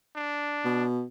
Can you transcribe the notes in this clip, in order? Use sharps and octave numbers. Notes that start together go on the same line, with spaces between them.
D4
B2